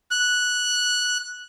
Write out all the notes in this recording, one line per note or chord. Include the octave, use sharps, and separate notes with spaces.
F#6